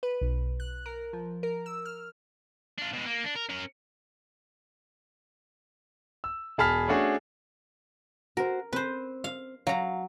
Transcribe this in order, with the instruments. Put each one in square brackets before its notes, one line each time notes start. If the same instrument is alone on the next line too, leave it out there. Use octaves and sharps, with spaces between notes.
[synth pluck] B4
B1
F#6
A#4
F3
A#4
E6
F6
[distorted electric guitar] D4 F4
B2 G#3
A#3
D4
A#4
C#4 A#4
[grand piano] E6
E1 G#4 A5 B5 F6 B6
A3 C#4 D4 F#4 G#4
[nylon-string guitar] F#4 C5 [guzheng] A#4
[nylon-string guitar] C4 [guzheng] B4 C5
[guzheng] F5
[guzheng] F#3 A#5 [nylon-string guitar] F5